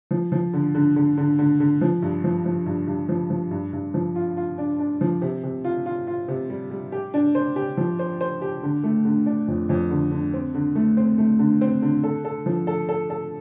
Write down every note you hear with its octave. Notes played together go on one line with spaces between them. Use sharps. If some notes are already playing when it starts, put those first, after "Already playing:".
F3
F3
D3
D3
D3
D3
D3
D3
F3
G2
F3
F3
G2
G2
F3
F3
G2
G2
F3
F4
F4
D4
D4
F3
C3
C3
F4
F4
F4
C3
G3
G3
G4
D4
C5
G4
F3
C5
C5
G4
D3
A3
D3
D4
F2
F2
D3
D3
C4
D3
A3
C4
A3
D3
C4
D3
A4
A4
F3
A4
A4
A4